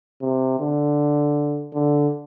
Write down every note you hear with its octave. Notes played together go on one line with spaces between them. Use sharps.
C3
D3
D3